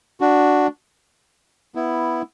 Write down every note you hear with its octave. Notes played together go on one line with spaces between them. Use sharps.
D4 F#4
B3 E4